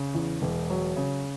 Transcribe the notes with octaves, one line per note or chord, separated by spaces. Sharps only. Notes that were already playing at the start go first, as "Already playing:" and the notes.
Already playing: C#3
E2
E1
F#3
C#3